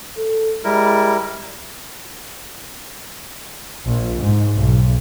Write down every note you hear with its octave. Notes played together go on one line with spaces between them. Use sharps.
A4
G3 G#3 E4 A#4
A#1
G#2
B1